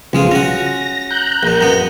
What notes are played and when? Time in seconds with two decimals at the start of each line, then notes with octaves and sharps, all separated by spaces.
0.13 B1 C#3 F3 G#3 F4
0.31 C#4 F#4 A#6
1.11 A#5 F#6 G6
1.43 A#1 A#2
1.61 F#2 B3